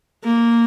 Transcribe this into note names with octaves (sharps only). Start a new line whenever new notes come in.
A#3